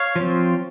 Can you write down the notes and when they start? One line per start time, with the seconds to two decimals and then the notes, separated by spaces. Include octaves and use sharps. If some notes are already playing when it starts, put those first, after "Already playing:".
Already playing: C#5 F5
0.16 F3 C4